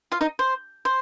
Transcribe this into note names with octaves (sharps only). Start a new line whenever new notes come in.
F4 F5
D#4 D#5
C5
C5